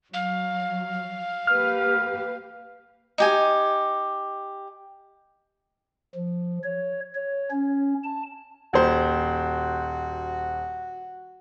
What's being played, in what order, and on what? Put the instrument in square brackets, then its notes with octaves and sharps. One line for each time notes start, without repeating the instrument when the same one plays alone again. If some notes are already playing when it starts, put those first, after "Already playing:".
[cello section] F#3 [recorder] F5
[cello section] A#3 G4 B4 [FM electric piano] F6
[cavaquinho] D#4 G4 G#5
[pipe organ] F3
C#5
C#5
C#4
A5
[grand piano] D#1 C5 [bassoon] F#4